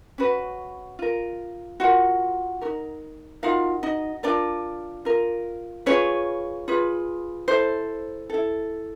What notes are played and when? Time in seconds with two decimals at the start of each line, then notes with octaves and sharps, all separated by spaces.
0.18 C#4 F#4 B4
0.99 F4 A#4
1.80 F4 F#4 A#4 F#5
2.61 F#4 A#4
2.65 D#4
3.43 D#4 F4 F#4 A#4 F5
3.83 D#4 D#5
4.23 D4 F4 A#4 D5
5.05 F4 A#4
5.86 C#4 F4 G#4 B4 C#5
6.68 F4 G#4 B4
7.48 E4 A4 C5
8.30 E4 A4